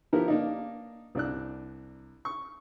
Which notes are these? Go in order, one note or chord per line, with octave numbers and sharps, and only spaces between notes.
F3 B3 E4 G4 A#4
A#3 D4 D#4
C2 D4 F#6
C#6